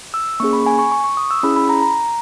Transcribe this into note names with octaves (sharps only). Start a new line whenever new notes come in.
E6
A#3 C#4 G#4 C#6
B5
G#5
C#6
C#6
C#6
D#6
E6
C#4 E4 G#4 B5
B5
A#5
A#5